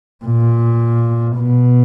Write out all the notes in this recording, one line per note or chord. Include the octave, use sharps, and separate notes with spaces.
A#2
B2